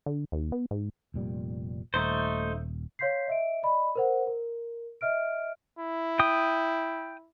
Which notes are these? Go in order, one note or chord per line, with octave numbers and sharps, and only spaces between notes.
D3
D#2
B3
G#2
F1 A#2 G3
D#1 A3 D#4 C5
C#5 F5 C6 G6 B6 C7
D#5 E5 D7
D5 D#5 B5
A#4 C5 F#5
A#4
D#5 E5 F6 D7
E4
G5 D#6